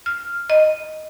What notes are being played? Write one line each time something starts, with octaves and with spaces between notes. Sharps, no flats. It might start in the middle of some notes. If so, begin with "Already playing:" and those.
F6
D#5